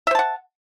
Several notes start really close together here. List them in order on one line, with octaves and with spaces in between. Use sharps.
E5 C5 A5 F#5